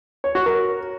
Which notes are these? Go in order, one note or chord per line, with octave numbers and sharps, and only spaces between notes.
C#5
F#4
A#4